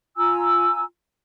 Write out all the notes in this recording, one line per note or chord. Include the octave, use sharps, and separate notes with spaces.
F4 G#5 A#5 E6